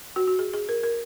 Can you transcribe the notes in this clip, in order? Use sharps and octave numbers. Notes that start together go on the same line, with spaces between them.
F#4
F#4
G#4
G#4
A#4
A#4